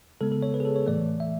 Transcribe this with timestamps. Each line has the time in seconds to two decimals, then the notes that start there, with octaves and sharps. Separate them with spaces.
0.21 C#3 G#3 B3 A4
0.32 A4
0.43 C#5
0.54 B4
0.60 G#4
0.65 A4
0.76 C#5
0.87 A2 E3 A3 D5
1.20 E5